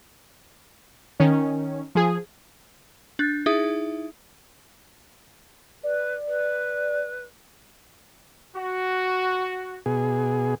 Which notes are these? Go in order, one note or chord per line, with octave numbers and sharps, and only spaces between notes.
D#3 C#4
F3 G#4
D4 F#6 A6
D#4 E4 G#4 E5 D#6
B4 D5
B4
F#4
B2 G#4